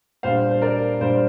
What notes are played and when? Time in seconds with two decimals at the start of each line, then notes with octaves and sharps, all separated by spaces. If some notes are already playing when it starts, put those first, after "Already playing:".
0.23 A#2 G3 D4 C5 F5
0.51 C5
0.62 A#4 D5
1.01 A#2 G3 D4 C5